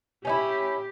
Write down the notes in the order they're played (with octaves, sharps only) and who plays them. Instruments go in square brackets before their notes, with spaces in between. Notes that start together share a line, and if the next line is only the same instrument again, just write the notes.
[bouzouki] C#4 D#4 E4 [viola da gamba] G4